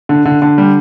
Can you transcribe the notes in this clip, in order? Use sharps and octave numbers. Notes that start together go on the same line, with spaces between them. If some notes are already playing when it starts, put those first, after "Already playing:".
D3
D3
D3
G3